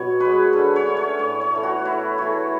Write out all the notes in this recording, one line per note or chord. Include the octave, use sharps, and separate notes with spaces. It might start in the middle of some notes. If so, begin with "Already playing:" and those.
Already playing: B2 F#3 B3 C#5
G#3 C#4 B4
D3 A4
C#5
A3 C#4
C#5
A2 C#5
C#5
E3 A3
F#4
A2 E4
E3 A3 C#5